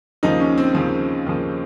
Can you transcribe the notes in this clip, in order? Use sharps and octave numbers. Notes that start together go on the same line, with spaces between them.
D#2 C#3 F3 D#4
C#4
C4
D#2 C#3 F3 C4
D#2 C#3 F3